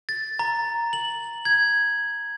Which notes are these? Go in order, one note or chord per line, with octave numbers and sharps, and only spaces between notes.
A6
A#5
F#7
G#6